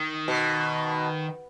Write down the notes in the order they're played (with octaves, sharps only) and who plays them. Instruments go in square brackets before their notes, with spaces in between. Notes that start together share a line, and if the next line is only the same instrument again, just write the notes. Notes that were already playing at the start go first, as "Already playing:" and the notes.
Already playing: [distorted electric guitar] D#3
[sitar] B2